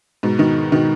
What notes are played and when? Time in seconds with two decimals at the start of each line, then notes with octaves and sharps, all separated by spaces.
0.23 G#2 B2
0.39 B2 D#3
0.72 B2 D#3